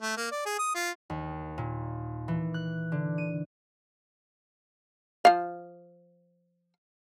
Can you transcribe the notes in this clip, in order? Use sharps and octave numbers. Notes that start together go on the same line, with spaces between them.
A3
A#3
D5
G#4
D#6
F4
D#2
A#2
E3
F#6
D3
D#7
F3 F5